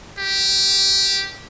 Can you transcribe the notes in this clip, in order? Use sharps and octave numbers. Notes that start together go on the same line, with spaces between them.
G4